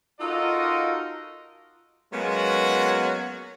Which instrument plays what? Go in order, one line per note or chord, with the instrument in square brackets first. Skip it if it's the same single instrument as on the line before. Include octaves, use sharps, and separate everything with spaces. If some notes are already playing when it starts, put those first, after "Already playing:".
[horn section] D#4 F4 F#4 A4 A#4 D#5
F#3 G#3 A#3 B3 C#4 F#4